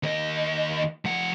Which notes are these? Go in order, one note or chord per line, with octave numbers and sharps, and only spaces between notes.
D#2 D#5
F3 F#5